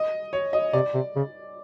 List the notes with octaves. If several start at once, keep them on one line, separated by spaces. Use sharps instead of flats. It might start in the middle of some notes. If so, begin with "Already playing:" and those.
Already playing: D#5
C#5
D#5
C3 D5
C3
C#3